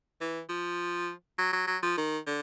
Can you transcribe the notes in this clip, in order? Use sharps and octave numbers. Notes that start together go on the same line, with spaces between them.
E3
F3
F#3
F#3
F#3
F3
D#3
D3